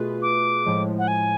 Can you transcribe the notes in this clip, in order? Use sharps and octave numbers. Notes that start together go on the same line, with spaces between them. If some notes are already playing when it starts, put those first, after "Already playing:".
Already playing: B2 A3 F4 G#4 B4
D6
A2 F3 G#3
F#5
G#5